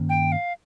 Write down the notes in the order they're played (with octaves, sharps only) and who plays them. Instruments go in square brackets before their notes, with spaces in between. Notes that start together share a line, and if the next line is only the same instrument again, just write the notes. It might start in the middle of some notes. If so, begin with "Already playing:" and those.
Already playing: [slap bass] G2 D#3 A#3 C#4
[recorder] G5
F5